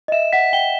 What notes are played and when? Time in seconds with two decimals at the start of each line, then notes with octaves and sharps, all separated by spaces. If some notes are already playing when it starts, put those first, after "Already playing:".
0.08 D#5
0.12 E5 E7
0.33 F#5 B6
0.53 G5 G7